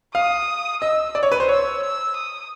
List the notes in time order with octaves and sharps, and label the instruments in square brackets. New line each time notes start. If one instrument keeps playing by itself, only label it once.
[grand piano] F5 [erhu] D#6
[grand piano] D#5 [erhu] E6
[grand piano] D5
C#5
B4
C5
[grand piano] C#5 [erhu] E6
[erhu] E6
D#6